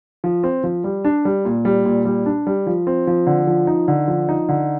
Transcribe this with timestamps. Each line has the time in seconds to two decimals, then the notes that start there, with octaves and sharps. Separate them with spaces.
0.24 F3
0.44 C4
0.64 F3
0.84 G3
1.05 D4
1.25 G3
1.45 A#2
1.65 G3
1.85 A#2
2.05 G3
2.26 D4
2.47 G3
2.67 F3
2.87 C4
3.07 F3
3.27 D3
3.47 F3
3.67 D#4
3.88 D3
4.08 F3
4.29 D#4
4.49 D3